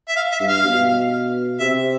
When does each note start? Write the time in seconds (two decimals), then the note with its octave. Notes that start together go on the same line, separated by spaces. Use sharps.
0.08 E5
0.16 F5
0.32 E5
0.40 G2
0.48 F5
0.64 B2
1.60 C3 E5